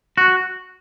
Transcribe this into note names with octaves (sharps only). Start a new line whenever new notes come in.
F#4